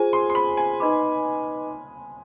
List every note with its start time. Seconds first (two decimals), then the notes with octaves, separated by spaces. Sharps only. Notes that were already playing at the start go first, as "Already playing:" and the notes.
Already playing: F4 G#4 C5 G#5
0.13 C6
0.30 C6
0.35 B5
0.57 G#5
0.80 D#4 B4 D#5 B5 D6